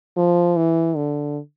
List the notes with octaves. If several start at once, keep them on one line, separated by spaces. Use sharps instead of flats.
F3
E3
D3